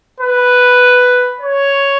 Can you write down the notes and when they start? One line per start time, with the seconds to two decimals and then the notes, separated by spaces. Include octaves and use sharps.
0.20 B4
1.41 C#5